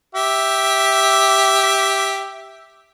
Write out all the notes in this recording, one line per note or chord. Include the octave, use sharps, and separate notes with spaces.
G4 E5